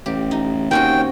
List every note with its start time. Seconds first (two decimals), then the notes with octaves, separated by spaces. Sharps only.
0.06 A1 G4
0.31 D#4
0.71 D#2 C4 C#4 F#4 G5